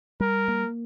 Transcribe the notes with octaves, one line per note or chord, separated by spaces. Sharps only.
G3 A#4
A#3